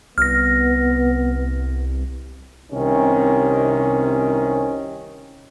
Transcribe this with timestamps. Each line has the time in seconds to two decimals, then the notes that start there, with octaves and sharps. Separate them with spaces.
0.18 C2 B3 F6 A#6
2.71 C2 C3 D#3 C#4